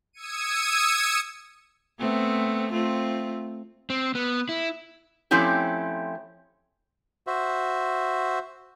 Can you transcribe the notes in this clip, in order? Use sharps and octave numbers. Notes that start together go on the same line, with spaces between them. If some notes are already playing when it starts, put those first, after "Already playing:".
D#6 E6 G#6 C#7 D#7
A3 B3 C4
A3 C4 F4
C4
B3
E4
F3 A3 C4 C#4 E4 G4
F#4 C5 E5